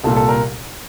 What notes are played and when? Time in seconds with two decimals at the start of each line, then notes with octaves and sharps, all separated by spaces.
0.04 C2 A#2 A4
0.16 A4
0.29 A#4